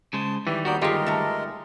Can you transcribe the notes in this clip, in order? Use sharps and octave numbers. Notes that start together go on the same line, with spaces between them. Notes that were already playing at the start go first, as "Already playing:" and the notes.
C#3 G#3 C5 A5
D#3 E3 G3 G4
D#2 B3 F#4 A#4 D5 G6
G1 G#3 D#4 F4 G4 G#4 A#4 D#5
A3 A#5